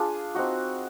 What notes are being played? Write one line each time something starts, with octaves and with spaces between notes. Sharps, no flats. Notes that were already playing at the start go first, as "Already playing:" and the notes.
Already playing: D4 F4 G#4
C4 D#4 F#4